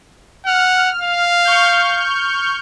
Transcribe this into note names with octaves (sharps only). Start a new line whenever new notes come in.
F#5 F6
F5
C#6 F6 G6